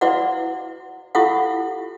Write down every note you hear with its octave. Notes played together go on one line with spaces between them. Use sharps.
E4 F#4 B4 D5 F5 F#5
E4 F4 G4 A4 F5 F#5